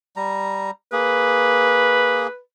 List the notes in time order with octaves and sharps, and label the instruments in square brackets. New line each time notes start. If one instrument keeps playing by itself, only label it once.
[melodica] G3 A#5
[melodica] A#3 G#4 [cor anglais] B4